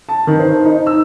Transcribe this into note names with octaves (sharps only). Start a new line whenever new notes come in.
A5
D#3
C5
D#4
E6